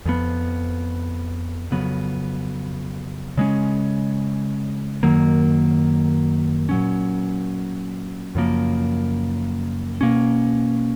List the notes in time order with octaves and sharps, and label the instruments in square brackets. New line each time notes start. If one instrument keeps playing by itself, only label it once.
[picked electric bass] F2 F3 B3
F2 C#3 F#3 B3
C#3 G#3 C#4
F#2 D#3 F#3 A#3
A#2 F#3 C#4
F#2 C#3 F3 A#3
B2 A#3 C#4